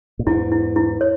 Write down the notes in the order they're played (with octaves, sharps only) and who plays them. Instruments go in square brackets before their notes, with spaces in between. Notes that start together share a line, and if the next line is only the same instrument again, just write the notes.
[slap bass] A#2
[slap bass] E2 G#2 [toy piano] E4
[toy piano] E4
E4
C#5